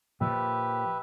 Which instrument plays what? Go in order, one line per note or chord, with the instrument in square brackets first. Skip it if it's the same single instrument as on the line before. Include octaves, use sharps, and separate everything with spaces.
[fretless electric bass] A#2 F3 [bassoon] G4 [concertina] B4 E5